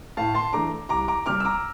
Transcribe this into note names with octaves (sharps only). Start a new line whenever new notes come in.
A2 F5 A5
A5 C6
E3 A3 D4 A#5 D6
C2 A#5 D6
A#5 D6
C3 G3 D6 F6
E6
A#5 D6